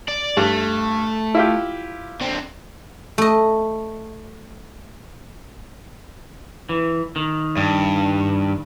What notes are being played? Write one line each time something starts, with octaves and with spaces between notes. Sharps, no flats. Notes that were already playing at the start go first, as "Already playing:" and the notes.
D5
G2 A3
E4 F4 G4
D3 C4
A3 D#5
E3
D#3
G2